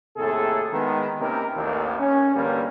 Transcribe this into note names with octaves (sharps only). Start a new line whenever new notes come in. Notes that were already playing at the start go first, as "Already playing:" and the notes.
D#2 A2 C3 G#4 A4
D#3 G#3 B3
C3 A#3 C#4 D#4 E4 A#4
A1 D#2 D#3
C#4
E2 G2 D3 G3 A#3